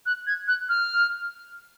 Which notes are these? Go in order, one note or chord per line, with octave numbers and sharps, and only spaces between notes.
F#6
G#6
F#6
F6